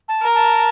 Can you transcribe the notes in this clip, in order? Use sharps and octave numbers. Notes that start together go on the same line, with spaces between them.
A5
A#4
A5